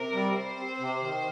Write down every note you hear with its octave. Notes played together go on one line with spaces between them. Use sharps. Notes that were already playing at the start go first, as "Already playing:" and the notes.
Already playing: C3 A#4
G3
G3 C5
C4
C3
D#3